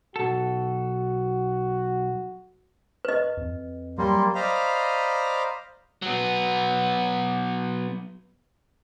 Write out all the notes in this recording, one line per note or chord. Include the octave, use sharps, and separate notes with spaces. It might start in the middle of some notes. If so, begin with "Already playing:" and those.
B1 F#4 A4
B4 D#5
F2
F#3 G3 A#3 C6
C5 D5 D#5 F5 A#5 B5
F#3 B3